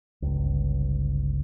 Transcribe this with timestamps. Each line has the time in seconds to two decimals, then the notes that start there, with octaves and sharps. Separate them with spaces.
0.22 G1 C#2